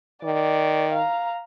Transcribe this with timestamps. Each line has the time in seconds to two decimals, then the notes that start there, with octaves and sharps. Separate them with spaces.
0.24 D#3 D5
0.92 F5 A#5